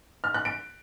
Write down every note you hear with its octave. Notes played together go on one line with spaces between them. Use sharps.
F6
F#6
D7